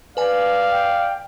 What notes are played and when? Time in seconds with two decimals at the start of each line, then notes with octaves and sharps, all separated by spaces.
0.17 B4 D5 F5 G#5
0.72 G5